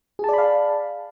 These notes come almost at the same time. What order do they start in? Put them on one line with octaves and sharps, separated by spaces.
G#4 A5 D5 B5 F5